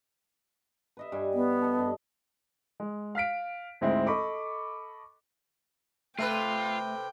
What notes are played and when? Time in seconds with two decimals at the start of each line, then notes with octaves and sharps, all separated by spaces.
0.97 B4 D#5 E5
1.12 G2 G#5
1.34 B3
1.62 A4 D#5
1.79 G2
2.80 G#3
3.15 F5 F6 B6 D7
3.81 D2 G#2 G#3 C4 E4 E5
4.07 A4 D#5 B5 C#6 D6
6.19 C3 A3 F4 A4 B4 E5 G5